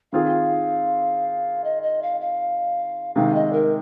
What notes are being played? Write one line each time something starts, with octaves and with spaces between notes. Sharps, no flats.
D#3 C4 F4 G#4 F5
D#5
D#5
F5
F5
C3 D#3 G#3 F5
D#5
A#4